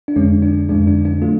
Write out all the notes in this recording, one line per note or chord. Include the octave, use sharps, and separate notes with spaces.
D4
F2 D3 G#3 C#4
D4
F2 D3 G#3 D4
D4
D4
F#3 A3 F4